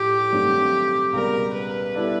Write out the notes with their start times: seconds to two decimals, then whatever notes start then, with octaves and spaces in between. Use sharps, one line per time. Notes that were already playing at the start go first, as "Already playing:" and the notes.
Already playing: A2 F3 A3 G4
0.32 G2 D#3 F#3 A3 C4
1.13 C#2 B2 G3 A#4
1.54 B4
1.95 G3 B3 E4 A4 D5